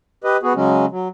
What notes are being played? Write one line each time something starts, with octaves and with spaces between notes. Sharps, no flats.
G4 B4 D#5
B3 F#4 G#4
C#3 F#3 G#3 C#4
F#3